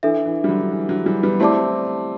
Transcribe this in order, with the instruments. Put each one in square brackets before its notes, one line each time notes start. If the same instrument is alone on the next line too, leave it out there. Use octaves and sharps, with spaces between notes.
[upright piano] E3 [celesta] D4 A4 E5
[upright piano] E3
G3
D3 F#3
D3
E3
D3 F#3
E3 G3
G3 B3
[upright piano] A3 C4 [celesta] E4 G4 D5 A5 D6